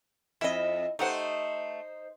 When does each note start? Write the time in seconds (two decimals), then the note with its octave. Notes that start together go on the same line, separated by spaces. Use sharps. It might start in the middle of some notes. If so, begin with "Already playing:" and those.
0.41 F2 E4 D#5 E5
0.99 A3 D#4 G4 C5 F#5